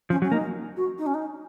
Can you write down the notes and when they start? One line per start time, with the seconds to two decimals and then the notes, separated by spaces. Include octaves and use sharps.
0.10 F3 C#4
0.22 F#3 C#4
0.32 A#3 D#4
0.76 F#4
0.98 D#4
1.06 C#4
1.14 D#4